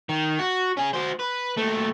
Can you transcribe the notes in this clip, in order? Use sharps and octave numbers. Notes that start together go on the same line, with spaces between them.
D#3
F#4
C#4 G#4
F#4 C5
B4
D#2 A3